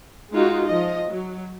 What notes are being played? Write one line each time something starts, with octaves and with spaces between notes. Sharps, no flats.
G#3 D#4 F4 F#4
F3 D#5
F#3